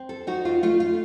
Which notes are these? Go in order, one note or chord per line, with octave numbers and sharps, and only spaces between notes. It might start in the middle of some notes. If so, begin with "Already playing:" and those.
Already playing: C4
A4
D#4 F#4
F4
A3 F4
F4